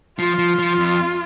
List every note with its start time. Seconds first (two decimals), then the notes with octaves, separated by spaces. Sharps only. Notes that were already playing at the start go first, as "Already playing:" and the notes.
0.19 F3 F4
0.38 F3
0.59 F3
0.78 F2